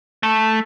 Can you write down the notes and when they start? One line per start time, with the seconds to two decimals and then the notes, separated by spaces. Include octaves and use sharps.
0.23 A3